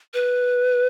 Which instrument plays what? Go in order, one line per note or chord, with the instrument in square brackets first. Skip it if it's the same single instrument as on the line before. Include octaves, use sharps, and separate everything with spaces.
[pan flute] B4